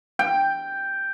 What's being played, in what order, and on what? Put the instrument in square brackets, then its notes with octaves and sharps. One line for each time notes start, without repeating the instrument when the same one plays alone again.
[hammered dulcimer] G5